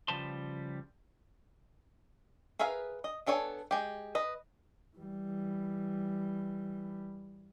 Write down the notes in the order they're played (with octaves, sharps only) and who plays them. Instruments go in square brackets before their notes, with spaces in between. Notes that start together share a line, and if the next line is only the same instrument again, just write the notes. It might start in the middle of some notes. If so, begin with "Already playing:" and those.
[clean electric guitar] C#3 F3 G3 B4 A5 C6
[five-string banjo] G#4 A#4 B4 E5 F5
D#5
B3 D4 A4 C#5 G#5
G#3 G4
B4 D#5
[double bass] E3 G3